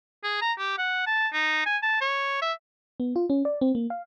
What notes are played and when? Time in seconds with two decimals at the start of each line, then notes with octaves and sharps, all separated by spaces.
0.23 G#4
0.41 A#5
0.58 G4
0.78 F#5
1.07 A5
1.33 D#4
1.66 G#5
1.82 A5
2.01 C#5
2.41 E5
3.00 B3
3.16 F4
3.30 C#4
3.45 D5
3.61 C4
3.75 A#3
3.90 F5